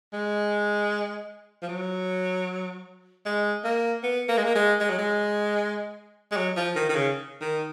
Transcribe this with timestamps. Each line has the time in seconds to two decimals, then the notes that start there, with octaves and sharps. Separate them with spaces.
0.13 G#3
1.62 F3
1.69 F#3
3.26 G#3
3.64 A#3
4.03 B3
4.29 A#3
4.37 G#3
4.44 A#3
4.55 G#3
4.80 G#3
4.90 F#3
4.98 G#3
6.31 G#3
6.37 F#3
6.57 F3
6.76 D#3
6.89 D#3
6.95 C#3
7.41 D#3